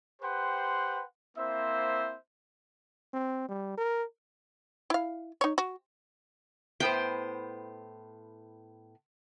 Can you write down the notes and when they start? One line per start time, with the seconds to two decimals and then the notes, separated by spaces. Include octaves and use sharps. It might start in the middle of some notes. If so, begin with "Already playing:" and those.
0.22 G4 B4 C5 F#5 G5 C6
1.37 A#3 C4 E4 C5 E5
3.13 C4
3.49 G3
3.78 A#4
4.90 E4 F5
5.41 D#4 C#5
5.58 F#4
6.80 A2 B3 C5 G5